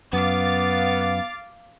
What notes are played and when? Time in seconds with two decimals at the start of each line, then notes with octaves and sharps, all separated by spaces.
0.13 F#2 B3 F5 D6 A6